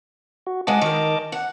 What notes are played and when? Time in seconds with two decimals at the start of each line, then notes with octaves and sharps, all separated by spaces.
0.47 F#4
0.67 G#3 D#5 F#5 A5 D6
0.81 D#3 A#4
1.32 F#5